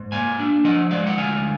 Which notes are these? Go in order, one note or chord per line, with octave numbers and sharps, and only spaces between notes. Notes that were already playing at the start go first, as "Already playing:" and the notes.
Already playing: G#2
A#3 F5 G#5
D4
F3 D#5 F#5
G#3 D5 F5
F#5
D2 F5 G#5